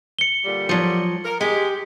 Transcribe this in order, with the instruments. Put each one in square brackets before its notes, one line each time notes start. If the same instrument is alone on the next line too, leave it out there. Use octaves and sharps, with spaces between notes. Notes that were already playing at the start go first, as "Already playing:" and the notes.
[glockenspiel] C#7 G7
[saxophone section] A#2 D3 G3
[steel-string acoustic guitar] F3 F#3
[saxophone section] A#4
[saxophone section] G#3 [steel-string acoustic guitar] G4